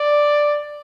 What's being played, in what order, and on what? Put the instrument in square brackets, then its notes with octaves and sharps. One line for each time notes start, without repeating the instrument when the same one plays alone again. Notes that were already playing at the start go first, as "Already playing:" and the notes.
Already playing: [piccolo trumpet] D5